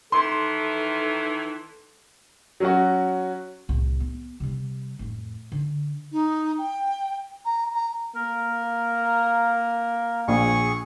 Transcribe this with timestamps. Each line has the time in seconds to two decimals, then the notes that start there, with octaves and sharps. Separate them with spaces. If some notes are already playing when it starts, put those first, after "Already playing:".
0.12 D#3 E3 A4 C6
2.60 F#3 C#4 F#4
3.69 C2 A2
4.00 B3
4.40 C3 G3
4.99 F2 A2
5.52 D3
6.12 D#4
6.58 G5
7.45 A#5
7.73 A#5
8.15 A#3 A#4
10.28 A#1 G#4 C#6